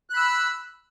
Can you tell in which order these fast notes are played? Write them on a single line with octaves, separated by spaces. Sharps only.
F#6 B5 E6